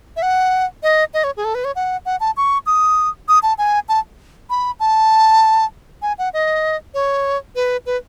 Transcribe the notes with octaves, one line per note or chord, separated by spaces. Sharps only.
E5
F#5
D#5
D#5
C#5
G#4
A4
B4
C#5
F#5
F#5
A5
C#6
D#6
D#6
A5
G#5
A5
B5
A5
G#5
F#5
D#5
C#5
B4
B4